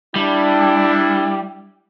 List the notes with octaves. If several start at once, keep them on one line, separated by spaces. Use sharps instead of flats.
G3 D4 E4